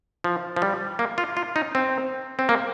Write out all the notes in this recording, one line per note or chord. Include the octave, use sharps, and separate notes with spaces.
F3
F3
G3
A#3
F4
F4
D#4
C4
C4
A#3